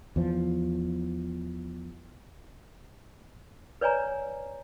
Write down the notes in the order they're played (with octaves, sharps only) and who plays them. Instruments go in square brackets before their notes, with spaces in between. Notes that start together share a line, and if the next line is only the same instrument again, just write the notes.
[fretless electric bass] E2 F3
[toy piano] B4 C#5 D5 G#5 A#5